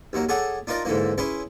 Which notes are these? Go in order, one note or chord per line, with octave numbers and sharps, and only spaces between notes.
D#2 F#3 A#3
G#4 A4 C#5 D5 F#5
D4 D#4 F4 A#4 D5
G#2 D3 E3 A#3
C#4 E4 G#4 B4 C6